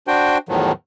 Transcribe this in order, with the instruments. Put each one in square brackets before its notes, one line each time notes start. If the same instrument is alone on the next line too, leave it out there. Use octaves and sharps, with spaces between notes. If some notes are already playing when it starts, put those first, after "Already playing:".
[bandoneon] D4 F#4 C5 G5
E2 A2 D#3 F3 F#3